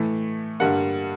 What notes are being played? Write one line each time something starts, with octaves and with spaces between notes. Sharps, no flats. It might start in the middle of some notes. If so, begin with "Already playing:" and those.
Already playing: A2 E3 A3
G2 D3 G3 A#3 F#5